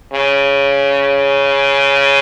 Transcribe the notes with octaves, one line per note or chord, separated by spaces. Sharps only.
C#3